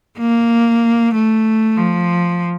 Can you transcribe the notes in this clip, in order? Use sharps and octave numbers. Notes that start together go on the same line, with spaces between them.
A#3
A3
F3